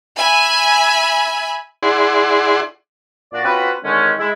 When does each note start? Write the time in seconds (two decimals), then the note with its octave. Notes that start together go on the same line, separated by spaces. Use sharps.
0.18 E5 G#5 B5
1.83 E4 G#4 D5 F#5 C6
3.33 A#2 F#4 D5
3.44 C4 C#4 F4 F#4 B4
3.84 D3 D#3 G#3 C4 C#4
4.19 G#3 E4